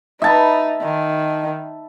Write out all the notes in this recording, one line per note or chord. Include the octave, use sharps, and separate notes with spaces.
D#4 E5 A5 B5
D#3